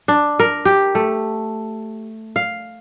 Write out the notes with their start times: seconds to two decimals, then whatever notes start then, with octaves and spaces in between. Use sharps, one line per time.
0.08 D4
0.40 A#4
0.65 G4
0.95 A3
2.36 F5